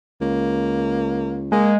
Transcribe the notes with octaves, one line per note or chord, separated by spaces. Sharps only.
C#2 A#3
G#3 A#3